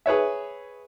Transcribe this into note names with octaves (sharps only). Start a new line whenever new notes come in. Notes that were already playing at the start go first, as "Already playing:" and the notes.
G#4 B4 C#5 E5